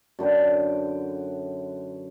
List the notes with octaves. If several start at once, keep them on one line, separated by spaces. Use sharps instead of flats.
F#2 D3 B4 G5